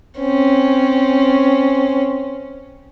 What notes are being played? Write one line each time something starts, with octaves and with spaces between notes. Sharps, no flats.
C4 C#4